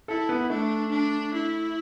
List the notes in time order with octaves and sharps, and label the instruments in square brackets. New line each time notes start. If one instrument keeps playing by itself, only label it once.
[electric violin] E4 [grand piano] A4
[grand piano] B3
[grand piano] A3 [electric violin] D4
[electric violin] D4
E4